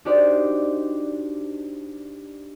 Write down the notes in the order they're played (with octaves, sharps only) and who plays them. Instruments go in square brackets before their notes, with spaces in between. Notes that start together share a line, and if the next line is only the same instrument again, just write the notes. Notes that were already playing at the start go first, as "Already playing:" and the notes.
[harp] D4 D#4 F#4 G4 C5 D5